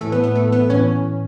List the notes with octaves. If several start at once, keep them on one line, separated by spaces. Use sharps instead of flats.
A2 E3 A3 A4
B3 B4
B3 B4
A3 A4
B3 B4
A2 E3 C#4 C#5